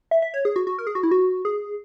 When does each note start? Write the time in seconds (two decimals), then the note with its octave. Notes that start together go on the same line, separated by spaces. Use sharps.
0.11 E5
0.22 E5
0.34 C#5
0.45 G#4
0.56 F#4
0.67 F#4
0.79 A#4
0.87 G#4
0.95 F#4
1.03 E4
1.11 F#4
1.45 G#4